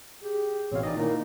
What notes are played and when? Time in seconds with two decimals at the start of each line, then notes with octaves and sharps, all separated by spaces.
0.22 G4 G#4
0.72 A1 B2 C4 C#5 F5
0.83 E3 D#4 D5 D#5
0.96 A#2 D#3 A#3 D#4 E4